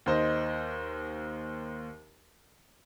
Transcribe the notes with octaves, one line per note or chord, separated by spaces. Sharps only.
D#2 C5 D#5